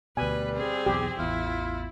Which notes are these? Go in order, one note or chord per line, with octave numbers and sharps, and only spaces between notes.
D2 B2 G3 B4 G#5
C4 G#4
B1 E2 G4
A1 E2 E4 F4